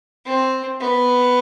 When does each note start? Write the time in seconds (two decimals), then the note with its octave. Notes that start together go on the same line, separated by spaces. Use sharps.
0.26 C4
0.81 B3